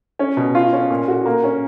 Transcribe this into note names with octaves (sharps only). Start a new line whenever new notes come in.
C#4
B2
F4
C#4
A#2
F#4
A#3
C#4